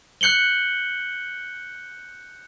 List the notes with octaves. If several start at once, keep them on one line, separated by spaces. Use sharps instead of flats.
F#6 G6 C#7 F#7 G7